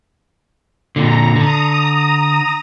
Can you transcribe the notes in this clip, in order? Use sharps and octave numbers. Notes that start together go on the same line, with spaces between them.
A#2 D3 A#5
D3 A#5 D#6